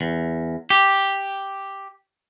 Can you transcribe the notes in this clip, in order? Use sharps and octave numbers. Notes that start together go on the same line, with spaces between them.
E2
G4